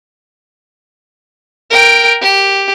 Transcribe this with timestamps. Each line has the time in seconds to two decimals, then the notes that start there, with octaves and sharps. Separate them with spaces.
1.70 A#4 G5
2.21 G4